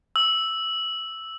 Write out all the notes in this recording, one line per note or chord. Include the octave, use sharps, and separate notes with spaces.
E6